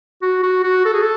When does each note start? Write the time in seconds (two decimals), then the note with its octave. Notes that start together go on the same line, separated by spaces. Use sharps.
0.22 F#4
0.43 F#4
0.64 F#4
0.85 A4
0.94 G#4
1.02 A4